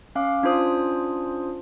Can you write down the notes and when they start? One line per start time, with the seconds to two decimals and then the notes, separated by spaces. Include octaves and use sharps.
0.16 C#4 F5 D6
0.42 C#4 D4 F4 C5 D#6